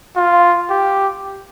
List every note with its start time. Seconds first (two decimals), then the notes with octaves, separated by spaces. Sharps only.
0.16 F4
0.70 G4